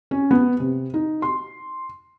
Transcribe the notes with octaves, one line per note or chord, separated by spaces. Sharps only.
C#4
B3
C3
D#4
C6